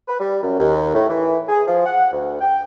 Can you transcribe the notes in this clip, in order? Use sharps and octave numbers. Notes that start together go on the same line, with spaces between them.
B4
G3
F#2
D#2
A2
E3
G#4
F3
F#5
D2
G5